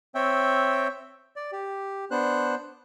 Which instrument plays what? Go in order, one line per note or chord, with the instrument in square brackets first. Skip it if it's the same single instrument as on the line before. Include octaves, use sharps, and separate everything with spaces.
[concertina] C4 C#5 E5 G5
D5
G4
B3 D4 C5 F#6